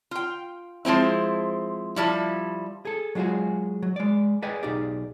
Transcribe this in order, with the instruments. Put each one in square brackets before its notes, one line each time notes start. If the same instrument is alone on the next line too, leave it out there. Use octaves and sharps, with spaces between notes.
[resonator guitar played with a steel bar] F4 G5
F3 G#3 C4 E4
F3 G3 E4
[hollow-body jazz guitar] G#4 A4
F#3 G#3 B3 F4 F#4 G#4
F#3
G#3 D5
G#4 B4 D5 D#5 G5 G#5
B1 D#4 G4 G#4 D5